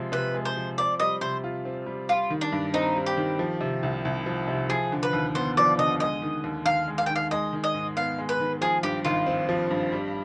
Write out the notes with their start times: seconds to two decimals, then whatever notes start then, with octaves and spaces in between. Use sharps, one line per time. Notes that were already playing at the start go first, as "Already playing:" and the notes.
Already playing: C3 F3 G#3
0.12 C3 B4
0.34 G#3
0.45 C5
0.56 F3
0.78 C4 D5
1.00 G3 D#5
1.21 C3 C5
1.44 F4
1.65 C4
1.86 G3
2.09 G3 F4
2.30 D#3
2.41 D4
2.52 G2
2.74 C4 D#4
2.96 G3
3.06 G4
3.17 D#3
3.39 F3
3.61 C3
3.83 C2
4.05 C2
4.26 F3
4.48 C3
4.69 F3 G#4
4.92 D3
5.03 B4
5.13 D#2
5.35 B3 C5
5.57 F3 D5
5.78 D3 D#5
6.00 G#3 D#5
6.22 D#3
6.44 D#2
6.66 D#2 F5
6.88 G#3
6.98 F5
7.06 D#3 G5
7.16 F5
7.31 G#3 D#5
7.53 D#3
7.64 D#5
7.74 G#2
7.97 B3 F5
8.18 G#3
8.29 B4
8.40 D#3
8.61 F3 G#4
8.83 G2 G4
9.05 G#1 F4
9.26 C4
9.49 F3
9.70 G2
9.92 G3